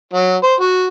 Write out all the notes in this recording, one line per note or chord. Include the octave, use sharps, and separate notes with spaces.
F#3
C5
F#4